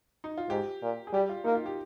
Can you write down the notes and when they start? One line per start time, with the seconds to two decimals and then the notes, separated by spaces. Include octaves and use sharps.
0.24 D#4
0.38 F4
0.49 G#2 G4
0.82 A#2
1.07 G#4
1.13 G3 G4
1.29 F4
1.44 A#3 D#4
1.55 F4
1.66 G4